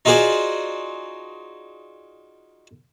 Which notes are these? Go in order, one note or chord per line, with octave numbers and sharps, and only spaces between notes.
D#4 F4 F#4 G#4 C5 D5